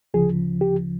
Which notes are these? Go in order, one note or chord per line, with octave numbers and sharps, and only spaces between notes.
D2 C#3 F3 G#4
G4